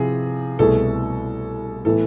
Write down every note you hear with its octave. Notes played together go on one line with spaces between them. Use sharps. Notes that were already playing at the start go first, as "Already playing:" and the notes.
Already playing: C3 F3 E4 G#4
C2 B2 A3 E4 G#4 A4
A2 E3 B3 E4 A4